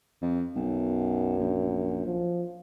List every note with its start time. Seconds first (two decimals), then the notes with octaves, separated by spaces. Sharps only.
0.22 F2
0.56 B1 F#2
1.38 A#1
2.06 F3